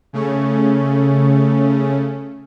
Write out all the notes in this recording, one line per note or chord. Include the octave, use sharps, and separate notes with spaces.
C#3 A3 C#4